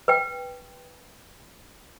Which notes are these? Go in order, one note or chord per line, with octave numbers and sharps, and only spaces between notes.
B4 G5